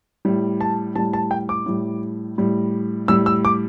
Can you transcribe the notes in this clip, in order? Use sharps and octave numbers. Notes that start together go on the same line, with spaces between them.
A2 G3
A5
A2 G3 A5
A5
G5
D6
A2 G3
A2 G3
A2 G3 E6
E6
D6